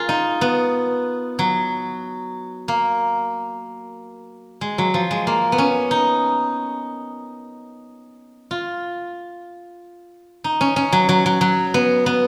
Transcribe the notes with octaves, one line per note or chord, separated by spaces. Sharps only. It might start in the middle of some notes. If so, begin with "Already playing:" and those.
Already playing: F4 G#4 A#4
D#4
B3
F#3
A#3
G#3
F#3
F3
G#3
A#3
B3
C#4
D#4
F4
D#4
C#4
C#4
F#3
F#3
F#3
F#3
B3
B3